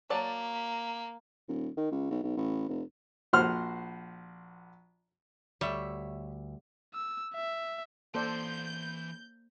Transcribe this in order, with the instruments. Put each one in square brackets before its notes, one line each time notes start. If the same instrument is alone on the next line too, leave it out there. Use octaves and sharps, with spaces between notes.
[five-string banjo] F#3 D5 A5 [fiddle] A#3
[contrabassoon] D#1
D#3
C#2
B1
B1
A1
F1
[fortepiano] A#1 F#4 C5 F#5 C6 F6
[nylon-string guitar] D2 [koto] G3 [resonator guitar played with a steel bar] C#5 E5
[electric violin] E6
E5
[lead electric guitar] E3 C6 [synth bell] A#3 [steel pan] A4 C5 D5 [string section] G6